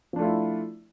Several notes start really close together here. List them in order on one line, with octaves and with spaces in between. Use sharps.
F3 D4 A3 F4 E4